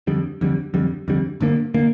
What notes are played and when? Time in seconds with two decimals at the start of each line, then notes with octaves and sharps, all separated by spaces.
0.07 F2 D3 G3
0.41 F2 D3 G3
0.74 F2 D3 G3
1.08 F2 D3 G3
1.40 G1 G2 D3 A#3
1.74 D3 A#3